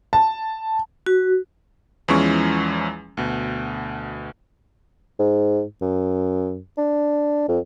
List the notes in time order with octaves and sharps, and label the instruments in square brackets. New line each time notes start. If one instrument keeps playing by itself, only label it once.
[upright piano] A5
[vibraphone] F#4
[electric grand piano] E2 E3 F3 G#3 C#4 C#6
D2 B2
[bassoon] G#2
F#2
D4
F2